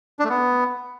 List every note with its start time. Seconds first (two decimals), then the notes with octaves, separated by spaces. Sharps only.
0.19 D4
0.24 A3
0.30 B3